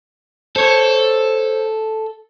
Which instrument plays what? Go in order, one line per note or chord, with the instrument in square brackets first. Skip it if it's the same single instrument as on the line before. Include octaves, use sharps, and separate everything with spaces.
[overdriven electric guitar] A4 [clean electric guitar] C5 C#5